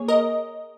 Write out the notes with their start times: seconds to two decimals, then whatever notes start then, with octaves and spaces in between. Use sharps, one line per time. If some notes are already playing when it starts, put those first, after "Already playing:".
Already playing: A#3 G#4 C#5
0.08 A#4 D#5